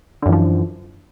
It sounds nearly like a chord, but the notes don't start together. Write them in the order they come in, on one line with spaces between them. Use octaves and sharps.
D3 F#2 E3 F3